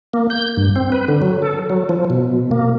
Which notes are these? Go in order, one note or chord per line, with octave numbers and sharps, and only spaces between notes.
A#3
G6
G2
C4
B4
D3
F#3
A4
F#3
F3
B2
A#3